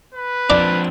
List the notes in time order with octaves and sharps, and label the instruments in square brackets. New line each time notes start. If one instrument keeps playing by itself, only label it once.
[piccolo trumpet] B4
[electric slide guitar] F3 C4 D4 [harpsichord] D5 A#5 D6